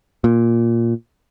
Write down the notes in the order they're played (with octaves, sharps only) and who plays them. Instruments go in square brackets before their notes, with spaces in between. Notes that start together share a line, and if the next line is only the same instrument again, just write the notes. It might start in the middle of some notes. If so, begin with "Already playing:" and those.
[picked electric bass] A#2